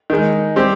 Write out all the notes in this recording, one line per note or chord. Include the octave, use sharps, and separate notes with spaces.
D#3 G#3 D#4
G3 C4 G4